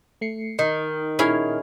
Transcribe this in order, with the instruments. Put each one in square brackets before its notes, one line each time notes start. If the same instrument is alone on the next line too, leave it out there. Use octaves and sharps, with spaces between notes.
[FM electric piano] A3 C7 C#7
[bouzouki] D#3 [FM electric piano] D#4 D#5
[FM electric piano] A#2 F6 [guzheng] C#4 E4 G#4